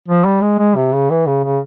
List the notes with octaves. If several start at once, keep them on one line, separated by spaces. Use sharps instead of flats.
F3
G3
G#3
G#3
C3
C#3
E3
C#3
C#3